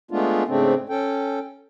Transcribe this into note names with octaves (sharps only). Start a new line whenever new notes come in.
G#3 A3 B3 D4 F4
G#2 C#3 A3 C4 D4
C#4 A4 G5